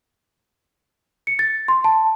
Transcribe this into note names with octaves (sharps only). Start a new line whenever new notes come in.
C#7
A6
C6
A5